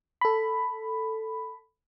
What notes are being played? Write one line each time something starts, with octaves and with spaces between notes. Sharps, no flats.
A4 B5